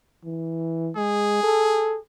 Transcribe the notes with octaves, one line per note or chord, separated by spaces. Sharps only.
E3
G#3 G#4
A4